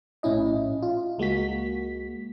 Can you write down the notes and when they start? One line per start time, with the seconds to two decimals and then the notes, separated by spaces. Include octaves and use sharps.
0.23 A#1 A2 C#4 E4 D#5
0.82 F4
1.18 C#2 G#3 A#3 F#4 B6